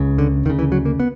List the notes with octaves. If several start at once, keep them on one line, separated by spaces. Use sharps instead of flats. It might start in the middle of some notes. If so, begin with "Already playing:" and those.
Already playing: C#2 C#3
D3
D2 C#3 D#3
E3
F#3
A#3
B3